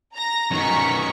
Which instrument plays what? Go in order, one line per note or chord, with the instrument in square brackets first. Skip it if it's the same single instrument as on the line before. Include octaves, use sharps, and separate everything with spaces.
[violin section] A#5 A#6
[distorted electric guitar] F#2 D#3 [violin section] A#5 C#6 B6